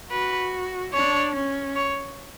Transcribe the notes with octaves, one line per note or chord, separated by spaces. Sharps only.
F#4 B4
D4 C#5
C#4
C#5